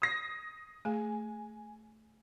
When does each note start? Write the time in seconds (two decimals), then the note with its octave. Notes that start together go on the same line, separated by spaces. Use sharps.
0.02 D#6 A#6 C7
0.85 A3 G#4 G#5